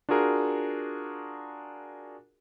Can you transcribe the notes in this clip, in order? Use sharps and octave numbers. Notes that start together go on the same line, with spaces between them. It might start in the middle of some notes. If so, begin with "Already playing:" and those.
D4 F4 F#4 G#4 A#4